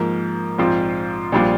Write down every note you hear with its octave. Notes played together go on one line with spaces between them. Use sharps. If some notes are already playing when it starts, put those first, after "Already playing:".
Already playing: G#2 F3 A#3
A#1 G#2 F3 C4 F4
A#1 A#2 G3 D4 F4